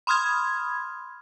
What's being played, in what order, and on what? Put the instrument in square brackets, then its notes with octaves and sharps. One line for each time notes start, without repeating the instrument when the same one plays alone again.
[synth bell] B5 C6 D#6 F6 G#6